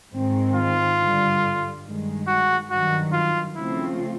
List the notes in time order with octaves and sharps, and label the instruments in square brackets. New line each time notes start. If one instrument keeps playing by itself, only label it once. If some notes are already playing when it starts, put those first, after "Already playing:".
[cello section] G#2 D#3 G#3 C4
[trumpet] F4
[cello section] G2 D3 G3
G2 D#3 G#3
[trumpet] F#4
[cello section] G2 D#3 F#3 [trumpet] F#4
[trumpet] F4
[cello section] C#3 F3 A3 C4 F4 [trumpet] E4